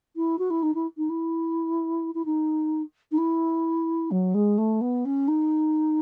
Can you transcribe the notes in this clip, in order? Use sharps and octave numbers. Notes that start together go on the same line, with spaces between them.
E4
F#4
E4
D#4
E4
D#4
E4
E4
D#4
D#4
E4
F#3
G#3
A3
B3
C#4
D#4